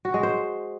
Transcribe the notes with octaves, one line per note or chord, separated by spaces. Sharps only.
F#4
G#3
C5